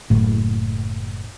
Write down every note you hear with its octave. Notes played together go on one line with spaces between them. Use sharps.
F#1 A2